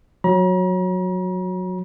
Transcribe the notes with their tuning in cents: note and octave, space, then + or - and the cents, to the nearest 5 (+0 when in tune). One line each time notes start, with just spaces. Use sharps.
F#3 -15 A#5 +40